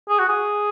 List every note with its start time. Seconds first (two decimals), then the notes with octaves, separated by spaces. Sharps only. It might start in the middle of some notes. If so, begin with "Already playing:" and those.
0.09 G#4
0.19 F#4
0.29 G#4